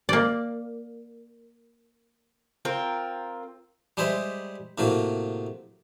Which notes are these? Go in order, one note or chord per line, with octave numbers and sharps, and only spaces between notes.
A#3 D5
C4 F4 A#4
G3 G#3 G#4 C5 E5
A2 C3 F#3 A#3